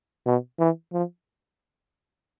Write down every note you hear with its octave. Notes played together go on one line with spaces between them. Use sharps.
B2
E3
F3